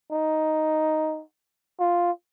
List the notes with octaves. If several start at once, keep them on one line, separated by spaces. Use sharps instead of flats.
D#4
F4